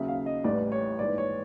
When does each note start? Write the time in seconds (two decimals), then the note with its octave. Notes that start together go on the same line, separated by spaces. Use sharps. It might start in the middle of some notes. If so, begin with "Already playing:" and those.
Already playing: D#2 C#3 F#3 E5
0.08 F5
0.26 D#5
0.44 A1 A2 E3 G3 D5
0.72 C#5
0.99 A#1 G#2 E3 D5
1.18 C#5